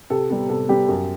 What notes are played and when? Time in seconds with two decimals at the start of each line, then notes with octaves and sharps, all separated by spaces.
0.10 C3 A4
0.30 G3 B3
0.49 C3 A4
0.69 G3 B3 G4
0.89 F#2